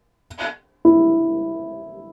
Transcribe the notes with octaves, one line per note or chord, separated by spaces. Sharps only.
E4